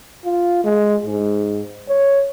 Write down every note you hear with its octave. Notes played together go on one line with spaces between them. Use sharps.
F4
G#3
G#2
C#5